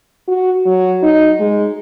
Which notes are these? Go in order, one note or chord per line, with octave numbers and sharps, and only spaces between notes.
F#4
F#3
D#4
G#3